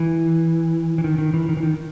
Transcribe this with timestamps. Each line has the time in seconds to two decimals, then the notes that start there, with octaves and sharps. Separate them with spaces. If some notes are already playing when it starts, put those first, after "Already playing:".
Already playing: E3
0.98 E3
1.04 D#3
1.18 D#3
1.34 E3
1.49 D#3
1.57 E3
1.63 D#3